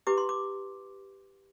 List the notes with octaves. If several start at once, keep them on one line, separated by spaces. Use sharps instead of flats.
E4 G4 B4 D6
C6
D6